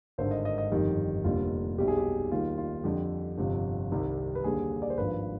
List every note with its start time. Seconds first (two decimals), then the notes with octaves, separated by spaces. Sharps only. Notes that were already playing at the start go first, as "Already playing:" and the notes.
0.18 G#1 G2 D3 C5
0.31 D#5
0.45 D#5
0.58 D#5
0.72 G1 F2 D#3 G3 G4
1.24 F1 D#2 D3 G3 F4
1.78 B1 B2 G3 G4
1.88 G#4
1.98 G4
2.32 D#2 D#3 G3 F4
2.58 F4
2.84 F2 D3 G3 G4
3.38 G1 F2 C3 F3
3.91 C2 C3 D#3 G3
4.35 B4
4.44 D#2 D3 G3 G#4
4.82 D5
4.90 C5
4.97 G#1 G2 F3 B4